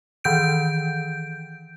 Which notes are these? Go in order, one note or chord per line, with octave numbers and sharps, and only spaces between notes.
D#3 E3 G6 D7